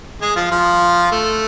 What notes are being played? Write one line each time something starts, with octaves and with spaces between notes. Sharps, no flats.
G#3 G#4
F3 F4
F3 F4
A3